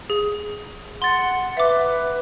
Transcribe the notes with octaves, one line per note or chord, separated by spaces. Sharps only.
G#4
F#5 C6 A6
B4 E5 D6